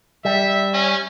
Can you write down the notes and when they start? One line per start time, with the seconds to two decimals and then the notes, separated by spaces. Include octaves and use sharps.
0.25 G3 E5
0.73 C#4